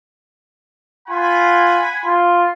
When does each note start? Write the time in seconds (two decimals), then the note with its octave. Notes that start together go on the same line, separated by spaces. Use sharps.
1.08 F4 F#5 G#5 B5 C6
2.04 F4 C6